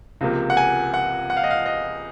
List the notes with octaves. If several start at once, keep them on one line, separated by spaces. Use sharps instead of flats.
C#2 C3 F3 A#3
F#5
G#5
F#5
F#5
F5
D#5
F5
D#5